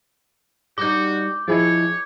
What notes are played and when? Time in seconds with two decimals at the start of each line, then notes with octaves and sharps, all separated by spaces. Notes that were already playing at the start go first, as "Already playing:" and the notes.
0.78 G3 D#4 F#4 D6 G6
1.48 F3 E4 G#4 C#5 D#5